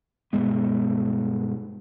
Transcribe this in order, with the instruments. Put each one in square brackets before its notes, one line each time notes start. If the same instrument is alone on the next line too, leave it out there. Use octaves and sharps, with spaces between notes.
[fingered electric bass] G2 B2 G#3 B3